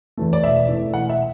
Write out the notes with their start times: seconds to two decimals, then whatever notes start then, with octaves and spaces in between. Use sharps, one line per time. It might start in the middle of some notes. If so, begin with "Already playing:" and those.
0.17 E2 E3 A3
0.33 D5
0.43 E1 E5
0.68 E2 E3 A3
0.94 E1 F#5
1.10 E5